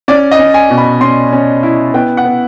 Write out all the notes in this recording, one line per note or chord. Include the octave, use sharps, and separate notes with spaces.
C#4 D5
D#5
C#4
G#5
B2
B5
C#4 C6
C#4
E4
B3 G5
F#5
B3